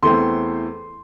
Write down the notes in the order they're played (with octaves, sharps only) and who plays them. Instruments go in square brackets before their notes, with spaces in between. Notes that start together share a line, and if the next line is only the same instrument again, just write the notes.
[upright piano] E2 E3 A3 C4 C6